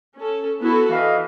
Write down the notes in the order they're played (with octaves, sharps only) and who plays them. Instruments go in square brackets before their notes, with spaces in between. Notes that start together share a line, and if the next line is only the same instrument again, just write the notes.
[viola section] C#4 A4
[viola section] B3 F#4 A4 [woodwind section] E4
[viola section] E3 [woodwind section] D#5 F5